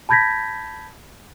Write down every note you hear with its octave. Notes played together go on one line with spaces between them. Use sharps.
A5 B5 G6 G#6 A#6 B6